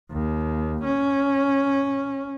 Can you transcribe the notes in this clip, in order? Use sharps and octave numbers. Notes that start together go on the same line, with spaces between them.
D#2
C#4